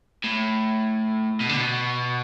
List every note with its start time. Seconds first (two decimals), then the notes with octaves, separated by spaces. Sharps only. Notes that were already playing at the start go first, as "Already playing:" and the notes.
0.24 A2
1.40 B2
1.49 D3
1.57 B2